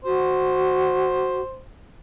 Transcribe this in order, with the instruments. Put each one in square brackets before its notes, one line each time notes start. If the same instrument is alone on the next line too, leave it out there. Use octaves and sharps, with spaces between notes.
[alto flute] F#4 [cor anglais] C5